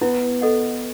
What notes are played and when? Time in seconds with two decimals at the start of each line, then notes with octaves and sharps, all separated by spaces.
0.01 B3 E4
0.42 A4 D#5 F#5